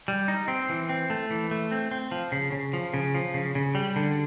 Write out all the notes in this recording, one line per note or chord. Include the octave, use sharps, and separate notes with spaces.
G3
D#4
C4
E3
C4
A3
E3
A3
C4
C4
F3
C#3
C#3
F3
C#3
F3
C#3
C#3
G3
D3